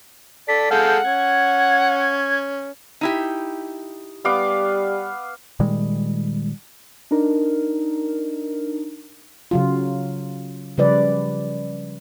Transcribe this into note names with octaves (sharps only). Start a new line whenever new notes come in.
A4 D5 B6
G#3 A4 F5 F#5 G6
C#4 G#6
D#4 E4 G4
G3 B3 F5 D6
A#2 D#3 G3 G#3
D4 D#4 A#4
C#3 F#3 F4
C#3 F3 G3 B4 D5